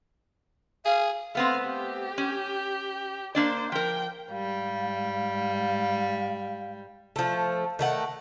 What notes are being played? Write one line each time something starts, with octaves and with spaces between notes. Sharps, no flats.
G#4 F5
A3 B3 C4 F5
G4
C#4
A#3 D4 C5 D5
F3 A#4 G5
G#2 G3 F5
F3 A3
D#3 A3 F#5